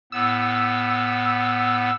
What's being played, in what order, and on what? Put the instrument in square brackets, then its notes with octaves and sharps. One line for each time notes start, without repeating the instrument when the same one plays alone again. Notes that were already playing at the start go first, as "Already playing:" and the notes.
[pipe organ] A2 B3 [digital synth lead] E6